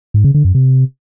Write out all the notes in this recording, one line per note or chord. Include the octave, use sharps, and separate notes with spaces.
G#2
C#3
D3
F#2
C3